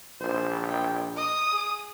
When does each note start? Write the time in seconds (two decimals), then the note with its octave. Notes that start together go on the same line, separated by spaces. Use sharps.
0.21 A#1 C5
0.70 G5
1.17 D#5 D#6
1.52 G#4